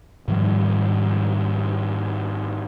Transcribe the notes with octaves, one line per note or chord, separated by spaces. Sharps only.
G#2 D#3 F3 G3